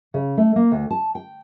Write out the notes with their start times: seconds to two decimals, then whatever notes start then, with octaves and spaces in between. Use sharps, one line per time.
0.14 C#3
0.37 A3
0.56 A#3
0.72 D2
0.90 A5
1.15 G5